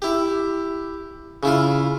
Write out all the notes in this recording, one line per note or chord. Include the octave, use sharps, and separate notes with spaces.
E4 G4
C#3 E4 F4